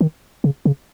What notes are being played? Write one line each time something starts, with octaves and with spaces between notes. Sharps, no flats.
D#3
C#3
C#3